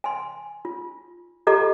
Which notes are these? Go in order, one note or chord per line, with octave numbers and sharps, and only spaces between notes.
G#5 C6
F4
F4 G4 A4 D#5 A#5 D6